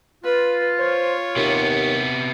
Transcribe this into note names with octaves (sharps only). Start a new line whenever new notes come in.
F4 B4
C5 C#5
D#2 C3 B3